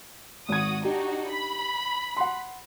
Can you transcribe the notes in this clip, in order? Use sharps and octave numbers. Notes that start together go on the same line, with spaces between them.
G#1 F#4 D#6 G#6
D4 D#4 F#4 G4
B5
F#5 C6